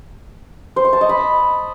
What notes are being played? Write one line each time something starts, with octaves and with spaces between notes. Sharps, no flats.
C5
C#6
A5
D#5
B5